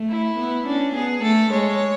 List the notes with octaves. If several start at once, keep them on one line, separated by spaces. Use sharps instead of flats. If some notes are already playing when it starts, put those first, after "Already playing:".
Already playing: A3
E4
B3
C#4 D4
B3 G#4
A3 A4
G#3 C#5